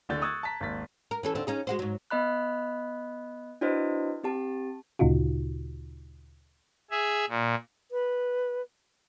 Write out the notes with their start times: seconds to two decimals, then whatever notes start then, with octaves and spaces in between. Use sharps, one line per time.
0.09 D1 D2 D3 G6 A6
0.21 C#6 D#6 E6 F#6 G#6 A6
0.43 A5 A#5 B6
0.60 G#1 D#2 A6 B6
1.11 A#4
1.23 E3 C#4 A4
1.35 D#2 D3 C4
1.47 C#4 D#4 G#4
1.67 G#3 F#4 C5
1.79 G#2 F#3
2.10 B3 D#5 B5 F#6
3.61 D4 E4 F#4 B4 C5 D#5
4.24 C4 G4 A5
4.99 D2 A#2 C#3 D#4 F4 F#4
6.91 G#4 E5
7.29 A#2
7.91 B4